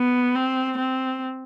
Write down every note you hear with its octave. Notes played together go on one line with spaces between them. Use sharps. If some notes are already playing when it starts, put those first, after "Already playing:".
Already playing: B3
C4
C4